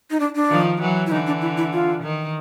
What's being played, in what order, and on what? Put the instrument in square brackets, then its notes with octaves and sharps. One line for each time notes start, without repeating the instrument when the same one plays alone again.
[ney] D#4
D4
D4
[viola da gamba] D#3 F3
E3 F#3
[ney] E4
[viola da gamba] D3 E3 [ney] D#4
[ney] D4
E4
E4
F4
[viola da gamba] D#3